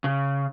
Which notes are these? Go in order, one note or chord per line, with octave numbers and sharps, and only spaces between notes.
C#3